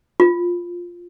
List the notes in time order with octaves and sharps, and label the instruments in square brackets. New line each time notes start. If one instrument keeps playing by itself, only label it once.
[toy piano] F4